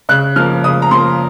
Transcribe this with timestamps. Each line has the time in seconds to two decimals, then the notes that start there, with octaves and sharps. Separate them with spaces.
0.09 C#3 F#6
0.36 F3 A#3 F6
0.64 C#3 D#6
0.82 A#5
0.91 F3 A#3 C6